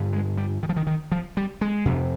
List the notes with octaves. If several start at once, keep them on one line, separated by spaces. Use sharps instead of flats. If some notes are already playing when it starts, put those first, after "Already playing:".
Already playing: G2 D3
G#3
G3
D#3
F3
D#3
D#3
F3
G3
G#3
F2 C3